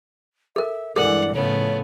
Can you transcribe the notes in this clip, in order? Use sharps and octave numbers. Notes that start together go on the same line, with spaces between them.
A4 A#4 E5
G2 E3 G#3 A4 A#4 D5 F#5
A2 C#3 F3 A3 B3 C#5